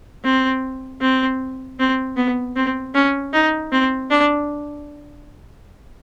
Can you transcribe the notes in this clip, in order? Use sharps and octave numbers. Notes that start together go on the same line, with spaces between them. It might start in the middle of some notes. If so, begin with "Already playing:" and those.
C4
C4
C4
B3
C4
C#4
D#4
C4
D4